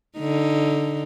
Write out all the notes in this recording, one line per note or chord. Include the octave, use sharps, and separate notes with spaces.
D3 D#4